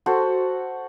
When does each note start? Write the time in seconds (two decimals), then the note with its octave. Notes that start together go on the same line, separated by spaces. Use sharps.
0.06 F#4 A4 C5 F#5